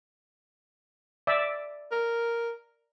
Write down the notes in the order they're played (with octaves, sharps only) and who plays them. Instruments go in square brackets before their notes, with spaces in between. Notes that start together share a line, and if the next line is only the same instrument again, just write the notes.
[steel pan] D5 E5
[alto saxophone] A#4